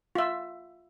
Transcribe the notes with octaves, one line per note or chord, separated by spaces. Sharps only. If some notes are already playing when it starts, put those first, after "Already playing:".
F4 E5